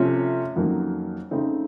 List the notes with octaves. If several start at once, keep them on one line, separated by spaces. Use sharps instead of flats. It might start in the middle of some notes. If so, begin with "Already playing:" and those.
Already playing: C3 F3 A3 C#4 F4
F2 D#3 F#3 A#3 C#4
C#3 A3 C4 D#4